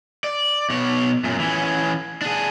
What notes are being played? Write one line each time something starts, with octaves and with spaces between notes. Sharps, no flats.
D5
B2 C#5
F#2 A#2
E3 C#4
D4 G#4